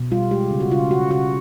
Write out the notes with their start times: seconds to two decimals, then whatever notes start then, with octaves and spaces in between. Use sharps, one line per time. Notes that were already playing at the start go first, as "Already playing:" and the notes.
Already playing: B2
0.11 G3 F4
0.31 G#3 G4
0.51 C#3
0.60 F#4
0.71 C#3 F4
0.90 C#3 F#4
1.11 C#3 F#4